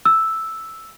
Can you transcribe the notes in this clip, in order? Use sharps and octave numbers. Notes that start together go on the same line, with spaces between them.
E6